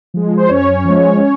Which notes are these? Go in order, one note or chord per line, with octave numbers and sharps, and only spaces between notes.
F3 G#3
C5
F#2 C#4 C#5
F3 G#3